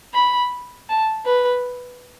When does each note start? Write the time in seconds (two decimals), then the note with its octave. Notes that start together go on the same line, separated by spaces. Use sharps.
0.14 B5
0.89 A5
1.25 B4